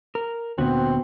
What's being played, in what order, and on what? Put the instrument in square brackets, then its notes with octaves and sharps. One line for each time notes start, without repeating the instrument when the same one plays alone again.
[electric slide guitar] A#4
[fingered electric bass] D2 A#2 [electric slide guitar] B3 F#4 [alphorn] C4